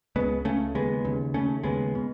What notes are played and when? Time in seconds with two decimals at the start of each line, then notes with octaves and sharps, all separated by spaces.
0.16 C#2 C#3 G#3 B3
0.45 C#2 C#3 A3 C#4
0.75 D#2 C#3 G#3 B3
1.05 D#2 C#3
1.34 D#2 C#3 A3 C#4
1.63 D#2 C#3 G#3 B3
1.95 B2